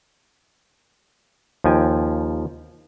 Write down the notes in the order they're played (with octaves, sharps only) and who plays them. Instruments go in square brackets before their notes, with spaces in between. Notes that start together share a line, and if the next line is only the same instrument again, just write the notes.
[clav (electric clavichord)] D#2 F3 G5 G#5